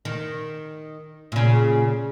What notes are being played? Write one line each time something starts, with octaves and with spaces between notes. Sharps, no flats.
D#3
A#2 C#3